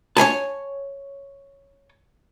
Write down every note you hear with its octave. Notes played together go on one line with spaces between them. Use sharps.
C#5 F5 G#5 A5